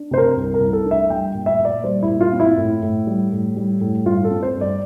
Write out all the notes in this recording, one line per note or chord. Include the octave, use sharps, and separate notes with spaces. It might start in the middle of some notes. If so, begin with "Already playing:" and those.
Already playing: D4
C3 C5
A#4
C2
A#4
C2
A4
D4
E5
G3 G5
A#2
E5
A#2
D5
G3 C5
E4
A#2
F4
C4
E4
A2
A2
G3
A2
G3
A2
G2 F4
A4
C4
C5
G2
D5